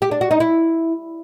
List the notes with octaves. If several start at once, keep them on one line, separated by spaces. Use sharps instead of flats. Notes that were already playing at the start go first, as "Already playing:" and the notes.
G4
D4
F#4
D#4
E4